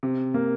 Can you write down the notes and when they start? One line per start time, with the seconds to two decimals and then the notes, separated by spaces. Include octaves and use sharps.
0.03 C3
0.34 A#3